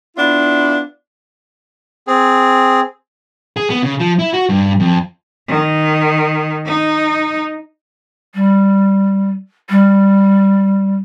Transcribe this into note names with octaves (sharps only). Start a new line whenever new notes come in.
B3 D4 E4 F4
C4 G#4
G#4
B3
C#3
F3
E4
F#4
G2
F2
D#3
D#4
G3
G3